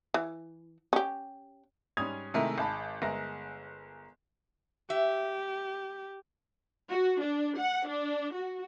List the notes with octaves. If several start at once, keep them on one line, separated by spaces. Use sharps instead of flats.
E3
C#4 G4
G#2 G3 C#4 D#6 G#6 F7
C3 D#3 G#3 A3 E4 A#4
G#1 G#3 A5 B5
G1 G#3 A#4 E5 A#6
G4 E5
F#4
D4
F#5
D4
F#4